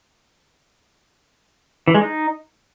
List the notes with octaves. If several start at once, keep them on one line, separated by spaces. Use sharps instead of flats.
E3
G#3
D#4